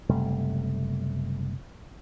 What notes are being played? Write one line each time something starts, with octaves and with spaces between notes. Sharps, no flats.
F#1 C3 G3 A3